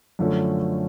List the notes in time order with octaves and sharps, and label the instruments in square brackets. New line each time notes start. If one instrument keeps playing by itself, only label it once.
[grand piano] F#2 D3 F3 A3 C#4